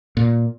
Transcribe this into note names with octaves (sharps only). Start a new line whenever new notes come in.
A#2